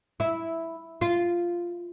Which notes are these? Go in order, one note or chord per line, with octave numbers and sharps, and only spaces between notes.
E4
F4